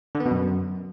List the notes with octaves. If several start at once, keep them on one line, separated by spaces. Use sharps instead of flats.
D3
B3
B2
F#2